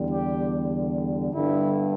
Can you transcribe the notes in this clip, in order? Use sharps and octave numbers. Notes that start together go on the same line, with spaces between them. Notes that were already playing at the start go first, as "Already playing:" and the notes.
Already playing: E2 D3 G3
G4
G1 G2 D3 E4